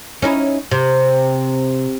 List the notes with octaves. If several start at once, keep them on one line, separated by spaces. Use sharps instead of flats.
C#4 D#4 E4
C3